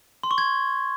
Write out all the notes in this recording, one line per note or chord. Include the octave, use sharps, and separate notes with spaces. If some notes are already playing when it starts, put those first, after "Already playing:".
C6
C#6
G#6